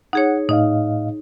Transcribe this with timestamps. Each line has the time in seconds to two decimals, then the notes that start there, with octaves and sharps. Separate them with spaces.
0.13 D#4 G#4 C#5 F#5
0.49 A2 D#4 D#5 F5